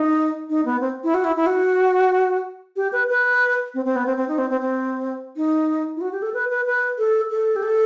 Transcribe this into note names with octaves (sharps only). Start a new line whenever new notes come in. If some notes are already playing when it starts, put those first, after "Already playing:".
Already playing: D#4
D#4
B3
C4
E4
F#4
E4
E4
F#4
G4
B4
B4
C4
C4
B3
C4
C4
D#4
C4
C4
C4
D#4
E4
F#4
G4
A4
B4
B4
B4
A4
A4
G4
A4